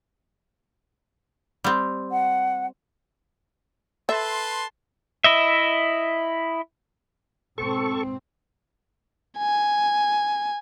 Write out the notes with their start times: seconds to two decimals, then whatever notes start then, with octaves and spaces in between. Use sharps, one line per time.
1.64 G3 C4
2.11 F#5
4.09 A4 B4 E5 A5 C6
5.24 E4 D#5 E5
7.58 G#2 B2 C4 A4 C#6
9.38 G#5